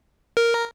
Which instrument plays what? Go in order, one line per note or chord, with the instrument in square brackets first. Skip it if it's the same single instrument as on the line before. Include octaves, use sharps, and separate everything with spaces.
[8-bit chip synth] A#4